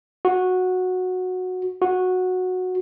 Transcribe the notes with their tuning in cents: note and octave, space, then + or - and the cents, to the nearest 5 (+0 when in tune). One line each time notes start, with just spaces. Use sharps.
F#4 -10
F#4 -10